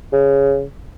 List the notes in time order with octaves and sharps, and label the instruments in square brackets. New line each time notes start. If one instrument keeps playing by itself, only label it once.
[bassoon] C#3